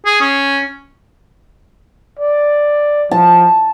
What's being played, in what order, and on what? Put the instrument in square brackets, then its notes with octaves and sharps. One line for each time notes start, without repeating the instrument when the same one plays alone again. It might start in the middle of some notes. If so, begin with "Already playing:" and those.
[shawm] G#4
C#4
[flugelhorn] D5
[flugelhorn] F3 [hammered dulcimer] A5